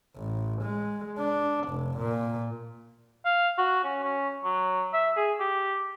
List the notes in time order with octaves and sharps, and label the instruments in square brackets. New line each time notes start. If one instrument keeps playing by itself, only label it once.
[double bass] A1
G#3
D4
F1
A#2
[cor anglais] F5
F#4
C#4
C#4
F#3
E5
G#4
G4